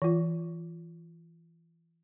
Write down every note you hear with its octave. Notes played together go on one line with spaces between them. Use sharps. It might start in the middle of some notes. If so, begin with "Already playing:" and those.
E3 F4